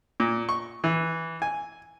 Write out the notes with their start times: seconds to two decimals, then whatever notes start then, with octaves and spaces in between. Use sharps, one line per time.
0.20 A#2
0.49 C#6
0.84 E3
1.42 G#5